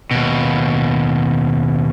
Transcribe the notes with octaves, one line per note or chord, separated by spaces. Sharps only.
D#2 B2